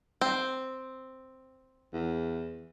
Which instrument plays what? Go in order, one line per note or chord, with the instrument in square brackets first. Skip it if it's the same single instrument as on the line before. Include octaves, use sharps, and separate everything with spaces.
[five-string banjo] C4
[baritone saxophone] E2